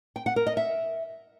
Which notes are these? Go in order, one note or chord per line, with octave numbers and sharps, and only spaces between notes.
G5
F#5
A#4
D#5
E5